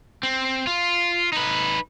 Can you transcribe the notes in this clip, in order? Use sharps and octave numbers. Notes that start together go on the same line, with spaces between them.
C4
F4
D#4 B4